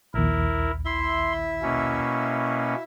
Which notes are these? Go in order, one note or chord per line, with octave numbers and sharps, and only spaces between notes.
A#1 D#2 E4 A#4
E4 E5 C6
B2 A#3 C#4